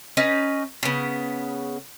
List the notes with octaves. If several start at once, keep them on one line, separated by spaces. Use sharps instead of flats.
C#4 D#4 B4
C#3 B3